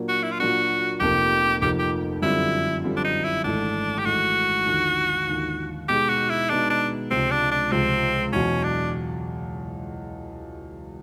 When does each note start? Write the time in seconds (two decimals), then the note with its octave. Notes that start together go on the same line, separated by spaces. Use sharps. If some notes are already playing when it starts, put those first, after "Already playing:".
Already playing: A#2 F#3 A#3 D4
0.09 F#4
0.23 E4
0.31 F4
0.40 A#2 F#3 A#3 D4 F#4
1.00 F1 F2 C3 F3 A#3 G4
1.61 F1 F2 C3 F3 A#3 G4
1.79 G4
2.22 F#2 D3 G3 C4 E4 F4
2.84 F#2 D3 G3 C4 F4
2.96 D4
3.04 D#4
3.24 E4
3.44 G#1 G#2 E3 A3 D4
3.99 G4
4.06 G#1 G#2 E3 A3 F#4
4.66 D#2 D3 F3
5.27 D#2 D3 F3
5.88 B2 G#3 B3 D#4 G4 G#4
6.09 F#4
6.30 E4
6.49 B2 G#3 B3 D4 D#4 G#4
6.70 D4
7.11 C#2 C3 F3 C4
7.31 D4
7.51 D4
7.71 C#2 C3 F3 C4
8.33 E2 B2 F#3 C#4
8.63 D4